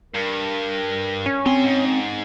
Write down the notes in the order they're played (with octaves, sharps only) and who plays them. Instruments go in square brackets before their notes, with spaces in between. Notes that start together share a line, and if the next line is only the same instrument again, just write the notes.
[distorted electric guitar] G2 [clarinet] A#4
[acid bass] C#4
[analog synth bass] C4 [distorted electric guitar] G4 C6
[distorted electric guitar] G#2